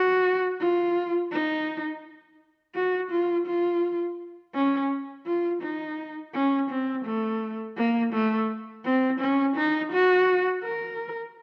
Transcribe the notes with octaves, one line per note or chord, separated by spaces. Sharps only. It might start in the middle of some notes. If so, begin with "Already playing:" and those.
Already playing: F#4
F4
D#4
F#4
F4
F4
C#4
F4
D#4
C#4
C4
A3
A#3
A3
C4
C#4
D#4
F#4
A#4